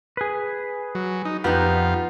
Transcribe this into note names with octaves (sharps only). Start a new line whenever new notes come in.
G#4 B4
F#3
D#4
F2 B3 D#4 F4 G4